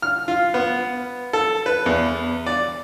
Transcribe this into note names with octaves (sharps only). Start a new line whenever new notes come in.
F6
F4
B3
A4
B4
E2
D5